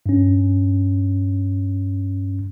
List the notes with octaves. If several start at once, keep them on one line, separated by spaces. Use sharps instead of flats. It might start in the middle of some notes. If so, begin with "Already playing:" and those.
G2 C#4